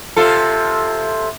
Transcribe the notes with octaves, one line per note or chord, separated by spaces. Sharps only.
C3 F4 A4